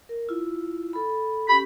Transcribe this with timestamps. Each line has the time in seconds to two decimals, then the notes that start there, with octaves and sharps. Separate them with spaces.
0.09 A#4
0.29 E4 F4
0.93 A4 B5
1.48 C#4 G4 B5